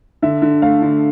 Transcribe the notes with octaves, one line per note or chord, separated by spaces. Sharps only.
D3 E5
D3
A3 F5
D3